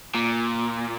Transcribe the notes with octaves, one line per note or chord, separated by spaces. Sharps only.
A#2